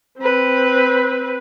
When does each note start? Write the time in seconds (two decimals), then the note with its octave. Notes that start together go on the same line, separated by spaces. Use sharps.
0.18 C4 B4